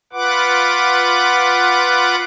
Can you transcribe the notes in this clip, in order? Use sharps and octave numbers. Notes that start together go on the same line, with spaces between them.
F4 B4 F#5 D6